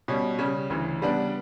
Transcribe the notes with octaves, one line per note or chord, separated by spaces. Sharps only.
B2 G3 C#4
C#3 G3 C#4
D2 C#3 E3
C#3 G3 B3 D4